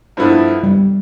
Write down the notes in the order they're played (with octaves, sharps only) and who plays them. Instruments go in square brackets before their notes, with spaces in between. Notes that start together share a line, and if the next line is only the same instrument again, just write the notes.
[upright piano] G2 F3 B3 E4 A4
[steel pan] G3